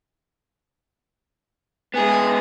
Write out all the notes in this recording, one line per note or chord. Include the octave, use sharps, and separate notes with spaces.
G#3 B3 G#4